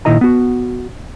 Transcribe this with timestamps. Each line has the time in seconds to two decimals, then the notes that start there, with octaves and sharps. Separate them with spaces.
0.05 A#2 D#3 E4 D#5 A#5
0.21 B3 F#4